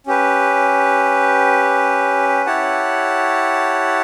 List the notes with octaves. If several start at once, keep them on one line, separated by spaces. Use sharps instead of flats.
C#4 G4 B4
E4 G4 C#5 F#5 A5